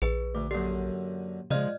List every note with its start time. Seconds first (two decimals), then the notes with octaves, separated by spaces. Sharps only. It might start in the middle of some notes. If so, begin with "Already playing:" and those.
0.02 A#1 G#4 B4
0.35 D2 D6
0.51 F#2 D3 A#3 G4
1.51 C#3 F3 G#3 D5 D#5 F6